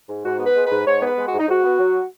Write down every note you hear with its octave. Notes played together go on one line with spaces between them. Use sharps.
G#2
G#2 F#4
B3
B4
G#3
G#2 B4
G#2 C#5
B3 B4
G#3
F#4
G#2
D#4
G#2 F#4
B3
F#3